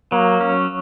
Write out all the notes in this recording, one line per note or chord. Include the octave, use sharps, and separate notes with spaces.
F#3 A#3
C#4